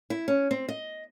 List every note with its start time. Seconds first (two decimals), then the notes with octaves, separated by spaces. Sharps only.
0.10 E4
0.28 C#4
0.51 C4
0.69 D#5